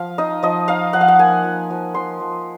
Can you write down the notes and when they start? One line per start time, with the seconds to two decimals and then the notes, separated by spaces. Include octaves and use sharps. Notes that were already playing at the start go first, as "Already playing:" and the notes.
Already playing: F3 F5
0.18 D#4 D#5
0.43 F3 D#5
0.68 D#4 F5
0.93 F3 F#5
1.01 F5
1.08 F#5
1.19 A#3 G#5
1.44 F3
1.70 F3
1.94 F3 C6
2.20 F3